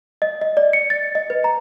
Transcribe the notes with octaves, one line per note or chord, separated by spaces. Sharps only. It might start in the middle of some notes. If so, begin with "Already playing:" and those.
D#5
D#5
D5
C#7
A6
D#5
B4
A#5